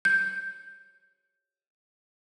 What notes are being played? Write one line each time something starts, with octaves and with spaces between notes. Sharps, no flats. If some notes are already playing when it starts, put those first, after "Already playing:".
G6